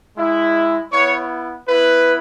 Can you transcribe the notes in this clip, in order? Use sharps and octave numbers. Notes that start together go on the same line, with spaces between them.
G#3 E4
B3 E4 C#5
B3 E4 B4